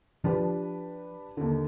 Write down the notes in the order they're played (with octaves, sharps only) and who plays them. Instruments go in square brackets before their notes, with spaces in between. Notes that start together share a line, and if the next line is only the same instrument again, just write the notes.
[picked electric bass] F3 [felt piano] D4 G4 B4
[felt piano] D#2 D3